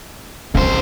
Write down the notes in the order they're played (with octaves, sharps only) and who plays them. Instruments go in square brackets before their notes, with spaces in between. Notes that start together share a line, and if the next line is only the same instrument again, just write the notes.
[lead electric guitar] C#2 C5 [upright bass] C4